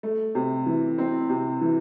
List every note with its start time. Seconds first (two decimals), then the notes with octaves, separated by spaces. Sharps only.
0.03 A3
0.35 C3
0.66 E3
0.98 C4
1.30 C3
1.61 E3